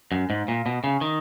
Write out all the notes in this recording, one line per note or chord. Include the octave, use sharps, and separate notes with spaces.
F#2
G#2
A#2
B2
C#3
D#3